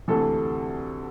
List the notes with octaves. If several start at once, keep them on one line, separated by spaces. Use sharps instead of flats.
D2 C3 E3 A3 A4